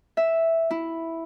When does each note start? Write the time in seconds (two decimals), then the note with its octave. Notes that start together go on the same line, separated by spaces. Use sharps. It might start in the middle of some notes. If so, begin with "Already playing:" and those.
0.17 E5
0.71 E4